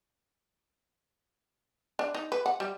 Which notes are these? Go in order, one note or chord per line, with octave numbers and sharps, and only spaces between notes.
D4
D#4
B4
F#5
G3